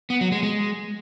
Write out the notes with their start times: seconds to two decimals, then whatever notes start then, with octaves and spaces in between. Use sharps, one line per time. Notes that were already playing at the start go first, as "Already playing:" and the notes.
0.10 B3
0.21 F#3
0.32 G#3
0.43 G#3